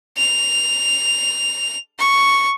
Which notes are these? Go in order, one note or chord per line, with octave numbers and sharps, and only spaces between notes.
F7
C#6